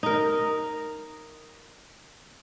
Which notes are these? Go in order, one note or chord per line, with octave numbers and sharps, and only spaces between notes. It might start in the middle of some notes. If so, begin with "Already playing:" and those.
D#4 A#4